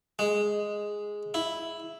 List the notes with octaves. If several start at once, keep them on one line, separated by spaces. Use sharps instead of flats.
G#3
E4